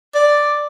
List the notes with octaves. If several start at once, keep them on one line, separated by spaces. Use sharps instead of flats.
D5